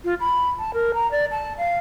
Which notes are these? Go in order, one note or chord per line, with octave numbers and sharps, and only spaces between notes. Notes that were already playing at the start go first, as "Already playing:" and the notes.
F4
B5
A5
A#4
A#5
D5
A5
F5